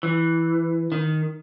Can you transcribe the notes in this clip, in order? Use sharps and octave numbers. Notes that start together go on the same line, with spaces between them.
E3
D#3